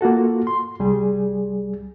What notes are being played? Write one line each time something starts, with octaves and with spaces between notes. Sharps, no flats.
A#3 F4 F#4 A4
C6
C2 G3 G#4